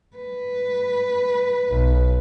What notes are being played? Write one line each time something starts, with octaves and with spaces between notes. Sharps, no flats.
B4
B1